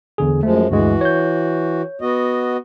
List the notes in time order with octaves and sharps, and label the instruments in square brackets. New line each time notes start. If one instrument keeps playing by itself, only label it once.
[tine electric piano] E2 D3 G#4
[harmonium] F#2 F3 G#3 [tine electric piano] A3
[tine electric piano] D2 G2 G#3 [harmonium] E3 F#4
[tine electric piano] C#5 G6
[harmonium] B3 F#4 D#5